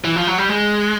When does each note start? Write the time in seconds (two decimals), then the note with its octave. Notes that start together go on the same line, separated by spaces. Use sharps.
0.04 E3
0.16 F3
0.27 F#3
0.38 G3
0.50 G#3